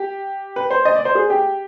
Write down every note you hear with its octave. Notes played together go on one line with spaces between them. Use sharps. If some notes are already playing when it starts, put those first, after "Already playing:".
Already playing: G4
B4
C5
D#5
D5
C5
G#4
G4